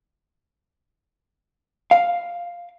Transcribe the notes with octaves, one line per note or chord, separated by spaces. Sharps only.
F5